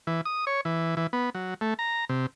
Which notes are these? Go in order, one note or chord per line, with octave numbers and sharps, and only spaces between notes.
E3
D#6
C#5
E3
E3
B3
F#3
A3
A#5
C3